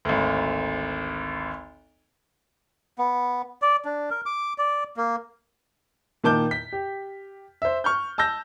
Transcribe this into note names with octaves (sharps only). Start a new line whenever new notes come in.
G#1 D2
B3
D5
D4
A#4
D6
D5
A#3
A#2 D#3 A5 D6 G6
B6
G4
C5 E5
C#6 F6 G6
A5 E6 G6 A#6